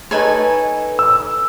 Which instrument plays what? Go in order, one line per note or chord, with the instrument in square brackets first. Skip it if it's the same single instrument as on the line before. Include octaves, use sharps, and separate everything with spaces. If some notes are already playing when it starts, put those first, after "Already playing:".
[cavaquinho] D#4 A4 C#5 [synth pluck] B4 G#5
[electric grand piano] E6